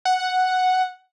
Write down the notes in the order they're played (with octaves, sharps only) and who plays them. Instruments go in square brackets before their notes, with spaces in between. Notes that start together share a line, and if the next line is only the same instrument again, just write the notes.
[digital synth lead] F#5